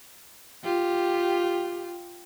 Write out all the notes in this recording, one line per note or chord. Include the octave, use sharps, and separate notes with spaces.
F4 G4